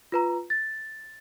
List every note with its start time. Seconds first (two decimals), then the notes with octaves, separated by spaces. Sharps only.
0.12 F4 B4 A#5
0.50 A6